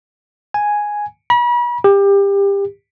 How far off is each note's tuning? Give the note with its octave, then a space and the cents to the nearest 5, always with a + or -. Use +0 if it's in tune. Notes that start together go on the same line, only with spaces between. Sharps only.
G#5 +0
B5 -40
G4 +25